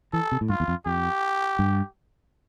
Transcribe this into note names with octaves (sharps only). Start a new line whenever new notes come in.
E3 A4
C3
A2
G2 F4
E2
F2
F2 G4
G2